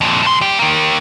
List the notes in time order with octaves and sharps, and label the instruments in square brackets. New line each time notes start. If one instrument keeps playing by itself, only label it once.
[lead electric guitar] F2 A#2
G2 C6
G2 G4
D#3 A#3